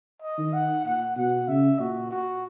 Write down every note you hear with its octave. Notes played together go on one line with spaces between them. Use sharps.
D#5
D#3
F#5
A#2 F#5
B2 F#5
C#3 E5
A#2 F#4
F#4